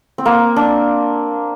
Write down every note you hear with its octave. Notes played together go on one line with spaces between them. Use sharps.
C4
A#3
D4